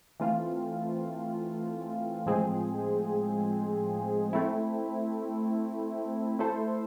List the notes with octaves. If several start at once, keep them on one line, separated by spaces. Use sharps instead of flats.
E3 A3 C4 F4
A2 F3 G#3 C4 G#4
A3 C4 E4
A3 E4 A4 C5